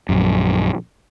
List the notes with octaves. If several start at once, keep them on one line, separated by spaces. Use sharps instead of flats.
A#1 F#2